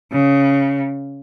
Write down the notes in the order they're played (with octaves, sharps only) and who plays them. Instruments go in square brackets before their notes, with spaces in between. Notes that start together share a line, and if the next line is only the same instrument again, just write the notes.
[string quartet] C#3